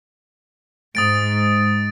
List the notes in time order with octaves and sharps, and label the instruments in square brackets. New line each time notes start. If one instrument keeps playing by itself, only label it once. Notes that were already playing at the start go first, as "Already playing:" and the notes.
[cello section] G#2 [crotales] D#6 A6 D7